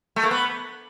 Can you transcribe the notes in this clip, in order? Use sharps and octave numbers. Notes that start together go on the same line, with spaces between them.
A3
A#3
B3